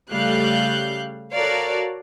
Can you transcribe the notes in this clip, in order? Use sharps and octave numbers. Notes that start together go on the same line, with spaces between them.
C#3 G3 A3 F5 F#6 G6
F#4 A4 A#4 C#5 D5 F5